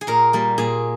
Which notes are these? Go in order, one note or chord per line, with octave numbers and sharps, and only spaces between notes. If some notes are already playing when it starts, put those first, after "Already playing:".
G#4
A#2 A#4
G3 A#3
A#2 G#4